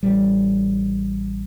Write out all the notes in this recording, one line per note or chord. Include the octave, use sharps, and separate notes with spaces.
A1 G3